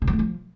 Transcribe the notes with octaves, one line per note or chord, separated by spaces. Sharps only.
C#3
F#3
A3
F3